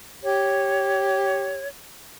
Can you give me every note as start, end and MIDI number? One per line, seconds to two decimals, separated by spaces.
0.23 1.63 67
0.23 1.68 73